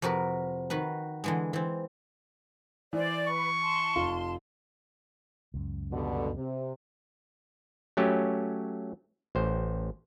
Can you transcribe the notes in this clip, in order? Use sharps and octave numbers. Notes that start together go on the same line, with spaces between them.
F2 C3 F#4 A#4 B4
D#3 F#4 B4
D3 E3 G#3
E3 C4
E3 C5 D5
B4 C#6
A5 C6
F1 F4
C#2 F#2
G2 B2 D3
C3
F#3 A3 C#4 G4
A1 C5